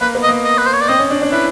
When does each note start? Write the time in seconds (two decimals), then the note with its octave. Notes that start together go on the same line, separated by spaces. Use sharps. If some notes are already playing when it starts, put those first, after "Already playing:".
0.01 A#3 B4
0.15 B3
0.23 D#5
0.29 A#3
0.45 D#5
0.58 B4
0.66 C5
0.73 C#5
0.81 D5
0.88 C4 D#5
0.99 C#4
1.10 D4
1.22 D4
1.32 E4 B4